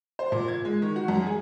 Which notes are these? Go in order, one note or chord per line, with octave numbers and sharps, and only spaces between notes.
C5
A#2
G#6
G#3
D#3
F#4
F#2
G#4